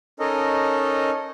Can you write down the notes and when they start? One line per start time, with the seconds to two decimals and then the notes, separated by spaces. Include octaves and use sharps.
0.19 C#4 D#4 A4 A#4 D#5